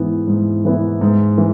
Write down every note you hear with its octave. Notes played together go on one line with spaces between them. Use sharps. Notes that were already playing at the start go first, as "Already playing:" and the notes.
Already playing: G#2 E3 B3 E4
G#2
E3 B3 E4
G#2
E3